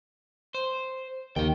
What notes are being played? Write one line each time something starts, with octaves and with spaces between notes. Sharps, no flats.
C5
D#2 D#3 G5